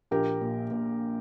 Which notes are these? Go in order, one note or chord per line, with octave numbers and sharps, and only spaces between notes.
A#1 G4 A#4
A#2
A#2